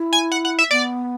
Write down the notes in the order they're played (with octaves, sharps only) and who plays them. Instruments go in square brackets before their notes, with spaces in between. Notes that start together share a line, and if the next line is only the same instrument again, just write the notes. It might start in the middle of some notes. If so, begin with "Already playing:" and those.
Already playing: [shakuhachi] E4
[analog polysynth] G#5
F#5
F#5
E5
[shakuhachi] B3 [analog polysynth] D5